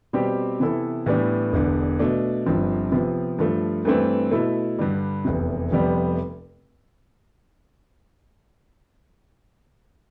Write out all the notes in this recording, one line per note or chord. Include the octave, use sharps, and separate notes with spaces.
B2 G3 C4 G4
C3 E3 B3 E4 A4
A2 E3 G3 B3 D4
E1 E2 D3
B2 A3 D4
G1 G2 F3 C4
C3 F3 B3
G2 F3 A3
G2 E3 A3 C4
B2 A3 E4
G2 D3 G3
F1 E2 C3
F1 F2 C3 G3 B3